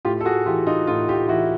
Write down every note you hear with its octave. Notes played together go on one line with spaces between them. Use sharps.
A2 F4 G4
A4
F#4 G#4
E3 F4 G4
D#4 F4
A2 D#4 F4
F4 G4
E3 E4 F#4